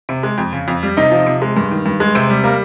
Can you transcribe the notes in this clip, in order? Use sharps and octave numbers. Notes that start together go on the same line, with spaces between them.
C3
G#3
F2
C#3
F2
G3
C3 D#4 D#5
F3
C3
G#3
G2
D#3
G2
G#3
C3 C4 C5
G3
G3 A#3 A#4